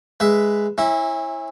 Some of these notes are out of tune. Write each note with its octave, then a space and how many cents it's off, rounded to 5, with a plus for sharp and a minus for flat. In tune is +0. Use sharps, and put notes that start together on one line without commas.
G#3 +0 B4 +5 E5 +0
C#4 -35 E4 +0 E5 -20